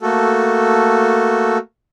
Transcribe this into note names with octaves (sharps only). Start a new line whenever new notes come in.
A3 A#3 F#4 A4